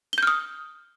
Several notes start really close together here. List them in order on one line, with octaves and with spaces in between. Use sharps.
G7 G6 F6 D#6